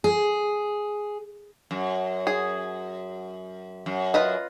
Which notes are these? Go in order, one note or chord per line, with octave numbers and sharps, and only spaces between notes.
G#4
F#2
G#4
F#2
F4 B4 D#5